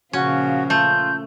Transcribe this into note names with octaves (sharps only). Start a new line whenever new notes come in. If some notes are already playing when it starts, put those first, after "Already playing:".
A#2 C#3 F3 C#4 F#4
A3 F4 G6